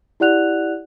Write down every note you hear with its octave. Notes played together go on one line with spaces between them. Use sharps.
E4 G4 D5 F#5 F#6 F7